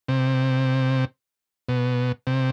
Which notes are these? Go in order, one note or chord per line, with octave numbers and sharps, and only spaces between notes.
C3
B2
C3